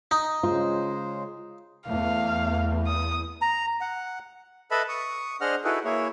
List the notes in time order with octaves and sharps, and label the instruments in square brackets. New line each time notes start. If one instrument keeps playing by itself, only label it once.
[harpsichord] D#4
[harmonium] C#3 G#3 C5 [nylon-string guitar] F4
[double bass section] E2 [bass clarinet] A3 [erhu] F5
[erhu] D#6
[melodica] A#5
F#5
[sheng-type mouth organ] A4 B4 D#5 E5 A5 B5
C#6 D#6
D4 G#4 C5 D#5 F#5 F6
D#4 E4 F#4 G#4 A4 B4
A#3 E4 G#4 C#5 E5